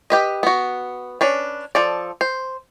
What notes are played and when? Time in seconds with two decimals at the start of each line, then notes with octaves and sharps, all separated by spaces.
0.10 G4 B4 D#5
0.43 B3 F#4
1.21 C#4 D4 B4
1.75 F3 A4 D5
2.21 C5